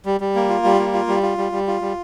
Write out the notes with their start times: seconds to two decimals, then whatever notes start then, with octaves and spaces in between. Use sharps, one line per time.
0.05 G3
0.20 G3
0.35 A#3
0.49 F4
0.64 G3
0.79 A#3
0.94 F4
1.08 G3
1.23 F4
1.38 G3
1.52 G3
1.67 F4
1.81 G3